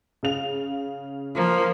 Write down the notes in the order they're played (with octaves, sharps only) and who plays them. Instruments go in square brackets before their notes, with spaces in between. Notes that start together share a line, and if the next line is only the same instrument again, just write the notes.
[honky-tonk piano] C#3 F5 F7
[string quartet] F3 A#3